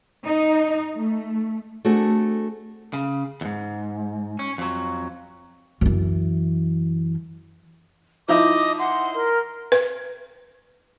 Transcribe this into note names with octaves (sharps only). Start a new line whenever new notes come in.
D#4
A3
A3 C4 D4 F#4 G#4 A4
C#3
E2 G#2
C#4
F2 F#3
F#2 E3
F3 D#4 E4 D#5 D6
F#5 C6
A#4
B4